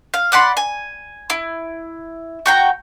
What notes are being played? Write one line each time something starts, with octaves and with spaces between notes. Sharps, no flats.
F5
D5 F#5 B5 C6
G#5
E4
F#4 G5 A#5